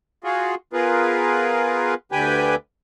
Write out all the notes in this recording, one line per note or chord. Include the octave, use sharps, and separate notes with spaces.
F4 F#4 G#4
B3 F4 G#4 A#4 B4
D2 D3 G4 B4 G5 G#5